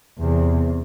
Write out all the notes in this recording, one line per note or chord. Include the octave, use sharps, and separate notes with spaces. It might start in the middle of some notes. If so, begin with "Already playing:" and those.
E2 C3